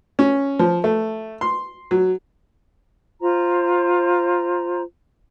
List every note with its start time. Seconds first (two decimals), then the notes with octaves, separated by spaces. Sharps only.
0.19 C#4
0.59 F3
0.84 A3
1.41 C6
1.91 F#3
3.22 F4 C5 A#5